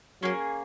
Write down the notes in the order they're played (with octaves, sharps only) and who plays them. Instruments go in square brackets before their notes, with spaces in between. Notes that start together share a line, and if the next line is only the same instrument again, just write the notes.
[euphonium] F#3 [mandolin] A#3 C#4 G#4